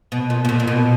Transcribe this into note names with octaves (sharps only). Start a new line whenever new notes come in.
B2
A#2
B2
A#2
A#2
B2